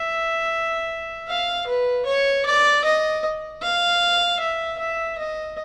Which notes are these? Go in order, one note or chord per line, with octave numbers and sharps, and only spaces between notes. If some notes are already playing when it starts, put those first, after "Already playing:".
Already playing: E5
F5
B4
C#5
D5
D#5
F5
E5
E5
D#5